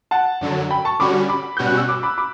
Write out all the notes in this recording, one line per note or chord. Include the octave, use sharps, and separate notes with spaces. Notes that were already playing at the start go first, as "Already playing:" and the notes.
F#5 A5
F#2 D3 F#3
G5 B5
A5 C#6
D3 G3 C#4 F#4 B5 D6
B5 D6
B2 G3 C#4 F#4 G6
F#6
E6
B5 D6
B5 D6
B5 D6